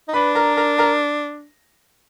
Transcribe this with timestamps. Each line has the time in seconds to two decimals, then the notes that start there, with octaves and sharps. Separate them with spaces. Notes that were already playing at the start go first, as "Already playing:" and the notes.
0.08 D#4
0.13 D4 B4 B5
0.35 A#4 A#5
0.57 A#4 A#5
0.78 A#4 A#5